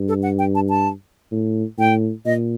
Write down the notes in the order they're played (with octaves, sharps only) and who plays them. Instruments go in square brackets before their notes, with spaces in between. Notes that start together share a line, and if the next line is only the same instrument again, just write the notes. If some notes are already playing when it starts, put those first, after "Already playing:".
Already playing: [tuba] G2
[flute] A4
F#5
G5
A5
A5
[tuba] A2
[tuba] A2 [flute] G5
[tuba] A#2 [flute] D#5